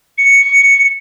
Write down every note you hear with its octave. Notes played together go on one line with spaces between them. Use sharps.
C#7